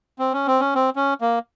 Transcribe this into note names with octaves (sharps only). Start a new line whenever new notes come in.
C4
C#4
C4
C#4
C4
C#4
A#3